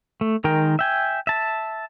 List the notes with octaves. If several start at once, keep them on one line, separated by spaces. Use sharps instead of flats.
A3
D#3 G#3 A#4 G5
E5 G5 G#5
E5 A5